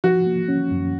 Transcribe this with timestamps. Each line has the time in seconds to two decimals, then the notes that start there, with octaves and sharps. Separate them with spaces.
0.04 F3 F#4
0.26 A#3
0.48 C#4
0.71 F#2